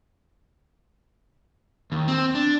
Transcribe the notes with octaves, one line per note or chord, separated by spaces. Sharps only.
D#2
C4
D4